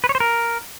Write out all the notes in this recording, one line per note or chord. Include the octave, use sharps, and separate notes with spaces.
B4
C#5
C5
A#4